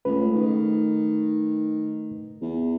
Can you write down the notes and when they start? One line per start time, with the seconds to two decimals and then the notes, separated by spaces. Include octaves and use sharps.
0.05 C#2 A3 B4
0.34 D#3
2.42 E2